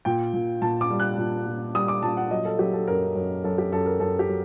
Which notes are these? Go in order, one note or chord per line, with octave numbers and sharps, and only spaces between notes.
A#2 G5
A#2
A#2 A5
D6
G3
F#6
A#2
A#2
G3 D#6
D6
A#2 A5
F#5
F#3 D#5
A4
F#3 G4
A4
F#2 A#4
F#2
F#2 A4
G4
F#2 A4
A#4
F#2 A4
G4
F#3